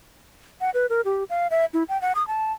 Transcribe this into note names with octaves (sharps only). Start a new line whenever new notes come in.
F#5
B4
A#4
G4
F5
E5
E4
G5
F#5
D#6
A5